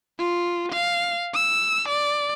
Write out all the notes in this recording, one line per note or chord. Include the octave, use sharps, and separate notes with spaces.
F4
F5
E6
D5